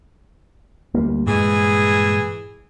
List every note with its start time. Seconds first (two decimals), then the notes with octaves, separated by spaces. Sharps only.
0.94 D2 G3 A#3
1.26 G2 A#2 E3 G#3 G#4